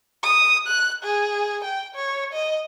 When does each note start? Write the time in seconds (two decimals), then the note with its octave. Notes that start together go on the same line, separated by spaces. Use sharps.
0.23 D#6
0.68 F#6
1.04 G#4
1.65 G5
1.95 C#5
2.33 D#5